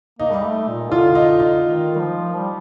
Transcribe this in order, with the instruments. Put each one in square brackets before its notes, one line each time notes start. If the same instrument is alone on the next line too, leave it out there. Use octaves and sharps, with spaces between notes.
[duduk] A#3 [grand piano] D#4
[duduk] G3
A3
A#2
[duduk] D3 [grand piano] F4
[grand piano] D#4
D#4
[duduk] D#3
G3
F3
G3